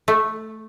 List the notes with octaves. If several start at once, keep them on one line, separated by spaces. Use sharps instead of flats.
A3